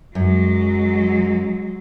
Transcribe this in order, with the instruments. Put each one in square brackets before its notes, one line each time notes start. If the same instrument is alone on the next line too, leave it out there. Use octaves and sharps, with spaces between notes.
[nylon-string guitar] F#2 [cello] F#3 G#3